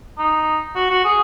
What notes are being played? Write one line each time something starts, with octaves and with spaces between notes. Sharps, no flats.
D#4
F#4
F#4
G#4